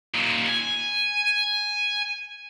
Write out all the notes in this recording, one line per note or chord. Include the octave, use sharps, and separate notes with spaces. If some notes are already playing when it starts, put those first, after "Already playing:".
D#2 A#2
G#5